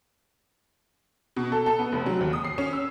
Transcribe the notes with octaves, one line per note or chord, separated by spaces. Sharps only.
B2
A4
A4
B3
F1
F#3
D#2
D#6
C7
C#4
E6